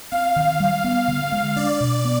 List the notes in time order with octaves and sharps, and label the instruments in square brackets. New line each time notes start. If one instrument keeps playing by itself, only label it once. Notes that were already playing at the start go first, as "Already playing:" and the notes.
[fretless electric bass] C4 [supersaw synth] F5
[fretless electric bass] D#3
G3
B3
D3
G#3
[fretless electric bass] D4 [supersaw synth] D5
[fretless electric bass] B2
B3